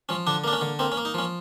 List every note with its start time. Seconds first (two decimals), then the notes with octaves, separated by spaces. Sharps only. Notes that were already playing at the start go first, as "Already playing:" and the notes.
0.09 F3 C#4
0.27 D3 D4
0.44 A#3 D4
0.53 C#4
0.61 D3
0.79 A#3 C4
0.92 C#4
0.97 A#3
1.05 D#4
1.14 F3 C#4